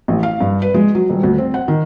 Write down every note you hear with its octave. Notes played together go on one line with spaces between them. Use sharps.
A1
F5
G2
B4
G#3
F#3
D#1
D2
C4
F#5
D#3